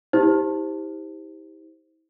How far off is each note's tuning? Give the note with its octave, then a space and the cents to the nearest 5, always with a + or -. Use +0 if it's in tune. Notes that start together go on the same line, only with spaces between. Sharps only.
E4 -40 G4 +20 C5 +0